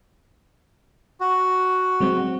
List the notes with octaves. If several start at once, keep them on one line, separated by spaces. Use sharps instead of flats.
F#4
F#3 G#3 C4